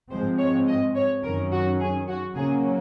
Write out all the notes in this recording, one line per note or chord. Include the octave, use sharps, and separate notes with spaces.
G#2 F3 G#3 C4 C5
C#5
D#5
C#5
F#2 D#3 F#3 C#4 A#4
F#4
G#4
F#4
C#3 F#3 A#3 C#4 G#4